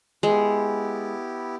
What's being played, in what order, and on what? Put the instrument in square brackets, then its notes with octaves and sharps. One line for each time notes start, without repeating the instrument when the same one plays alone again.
[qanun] G#3 [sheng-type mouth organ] B3 E4 G4